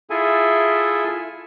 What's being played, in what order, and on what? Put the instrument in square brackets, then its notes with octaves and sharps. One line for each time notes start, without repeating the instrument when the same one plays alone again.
[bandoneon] E4 F4 G#4 A4 E5 G#5